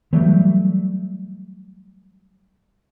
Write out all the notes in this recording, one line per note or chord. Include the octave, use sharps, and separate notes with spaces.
E3 F#3 G3 A3